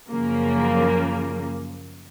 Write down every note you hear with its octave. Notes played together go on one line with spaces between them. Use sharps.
F#2 C#3 F3 A#3